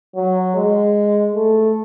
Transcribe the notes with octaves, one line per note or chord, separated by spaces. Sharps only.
F#3
G#3
A3